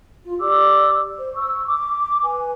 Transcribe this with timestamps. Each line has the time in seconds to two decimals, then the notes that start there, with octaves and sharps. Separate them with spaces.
0.24 F4
0.40 G4 D5 D6 E6
1.18 C5
1.36 C#6 E6
1.67 D6
2.24 B4 G#5